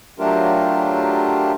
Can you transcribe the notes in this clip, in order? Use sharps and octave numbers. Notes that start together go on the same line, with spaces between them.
F#3 A3 D4 F4 G4 A#4